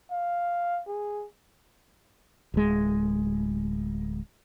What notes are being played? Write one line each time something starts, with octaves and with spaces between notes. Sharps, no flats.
F5
G#4
D1 G#3